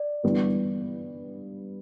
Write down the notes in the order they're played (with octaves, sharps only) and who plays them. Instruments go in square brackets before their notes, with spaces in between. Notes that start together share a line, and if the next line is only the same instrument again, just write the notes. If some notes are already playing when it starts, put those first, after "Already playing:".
Already playing: [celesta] D5
[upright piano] G2 E3 G3 B3